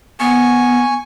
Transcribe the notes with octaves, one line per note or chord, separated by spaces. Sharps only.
B3 G#5 C#6